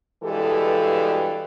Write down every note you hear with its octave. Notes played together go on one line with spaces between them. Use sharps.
G2 B2 E3 G#3 G4 A4